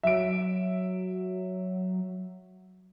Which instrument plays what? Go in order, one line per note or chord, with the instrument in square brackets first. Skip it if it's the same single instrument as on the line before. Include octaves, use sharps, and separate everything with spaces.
[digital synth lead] F#3 [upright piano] E5 D7